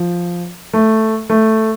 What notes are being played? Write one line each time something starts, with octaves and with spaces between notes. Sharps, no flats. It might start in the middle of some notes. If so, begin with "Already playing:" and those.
Already playing: F3
A3
A3